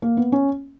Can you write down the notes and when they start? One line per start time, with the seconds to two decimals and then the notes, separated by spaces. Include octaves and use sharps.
0.02 A#3
0.17 B3
0.32 C#4